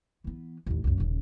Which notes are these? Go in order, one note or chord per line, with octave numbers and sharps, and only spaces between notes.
E3 B3
A1 D#2
C#2 F#2
D#1 C#3